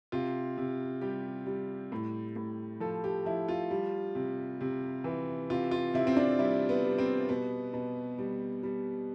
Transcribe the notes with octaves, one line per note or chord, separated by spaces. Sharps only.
C3 F4
C3
G3 G4
G3
A2
A2
F3 A4
G4
F3 E4
F4
G3
C3
C3
E3
C3 F4
F4
C3 E4
C4
D4
G3 E4
B3
G3
C4
B2 B3
B2
G3
G3